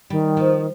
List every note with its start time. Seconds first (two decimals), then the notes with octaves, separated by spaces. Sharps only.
0.10 D#3 G3
0.37 F3